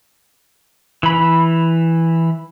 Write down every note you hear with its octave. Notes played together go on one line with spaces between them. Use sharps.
E3 B5